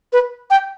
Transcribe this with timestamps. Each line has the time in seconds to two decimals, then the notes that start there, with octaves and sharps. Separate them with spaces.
0.13 B4
0.51 G5